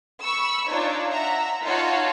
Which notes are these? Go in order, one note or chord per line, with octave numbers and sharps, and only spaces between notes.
B5 C#6 E6
D4 D#4 F4 C#5
E5 F#5 A#5
D#4 F4 F#4 C#5 A5